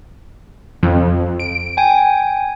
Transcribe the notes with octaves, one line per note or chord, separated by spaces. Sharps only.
F2
D7
G5 G#5